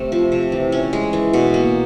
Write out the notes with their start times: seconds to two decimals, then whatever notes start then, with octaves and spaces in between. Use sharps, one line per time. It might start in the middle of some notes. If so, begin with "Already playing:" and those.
Already playing: C3 A3
0.12 F3
0.32 C3
0.52 E3
0.72 C#4
0.93 G#3
1.13 E3
1.33 B2
1.54 A#3